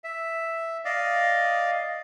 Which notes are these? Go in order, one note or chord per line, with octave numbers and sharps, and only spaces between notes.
E5
D5 D#5 F5